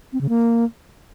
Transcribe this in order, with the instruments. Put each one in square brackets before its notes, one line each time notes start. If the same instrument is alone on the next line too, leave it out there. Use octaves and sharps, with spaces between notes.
[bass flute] C4
C#3
A#3